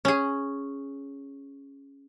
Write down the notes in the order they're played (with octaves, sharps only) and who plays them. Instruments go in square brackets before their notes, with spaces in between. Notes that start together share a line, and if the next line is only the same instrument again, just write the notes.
[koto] C#4 G#4